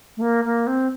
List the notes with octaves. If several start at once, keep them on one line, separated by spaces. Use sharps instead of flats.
A3
A#3
A#3
C4